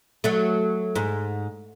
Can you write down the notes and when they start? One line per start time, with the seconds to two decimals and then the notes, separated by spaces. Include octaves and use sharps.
0.24 F#3 A3
0.96 G#2